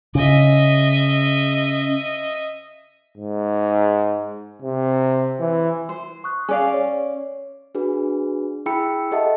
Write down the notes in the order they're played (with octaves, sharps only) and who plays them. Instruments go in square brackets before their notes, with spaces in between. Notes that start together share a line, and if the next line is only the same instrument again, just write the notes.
[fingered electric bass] C#3 [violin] D#5 E5
[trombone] G#2
C3
E3
[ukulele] C5
[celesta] C#6 D#6 F#6
[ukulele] C#4 D5 F5 [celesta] G#4 G#5
[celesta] C#5
[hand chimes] D4 F#4 G#4 B4
E4 G#4 G5 B5 E6 C#7
G4 A4 D#5 E5 F#5 A5